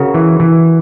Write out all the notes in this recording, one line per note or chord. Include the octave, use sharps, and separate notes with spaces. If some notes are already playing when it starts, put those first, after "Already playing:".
Already playing: C#3 F#4 A#4
E3
E3